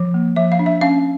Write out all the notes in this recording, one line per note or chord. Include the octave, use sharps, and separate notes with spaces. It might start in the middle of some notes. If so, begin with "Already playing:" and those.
Already playing: F3
A#3
F3 E5
F5
D4
E5
C#4 F5